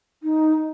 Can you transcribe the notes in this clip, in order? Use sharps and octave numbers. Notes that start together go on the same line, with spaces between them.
D#4